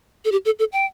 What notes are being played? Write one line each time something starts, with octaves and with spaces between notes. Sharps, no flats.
A4
G4
A4
A4
G5